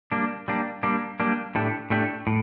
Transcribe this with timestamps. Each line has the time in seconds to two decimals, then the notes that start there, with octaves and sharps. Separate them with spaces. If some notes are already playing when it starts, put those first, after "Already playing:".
0.12 G3 A#3 D4
0.48 G3 A#3 D4
0.83 G3 A#3 D4
1.20 G3 A#3 D4
1.55 A2 A3 D4 G4
1.90 A2 A3 D4 G4
2.27 A2